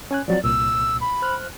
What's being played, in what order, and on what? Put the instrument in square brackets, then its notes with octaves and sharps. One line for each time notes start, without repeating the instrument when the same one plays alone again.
[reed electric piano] C#4 G#5 F#6
[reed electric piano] F3 F#3 C4 [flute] D5
[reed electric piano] C2 A#2 [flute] E6
[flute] B5
[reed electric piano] C5 F6 F#6